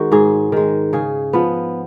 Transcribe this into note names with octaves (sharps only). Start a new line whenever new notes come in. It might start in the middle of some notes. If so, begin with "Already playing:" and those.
Already playing: D#3 G#3 F#4
G#2 G#4
D#3 G#3
C#3 G#4
F3 B3